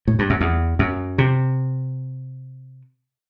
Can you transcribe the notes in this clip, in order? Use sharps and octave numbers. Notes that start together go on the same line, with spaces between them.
A2
G2
F#2
E2
F#2
C3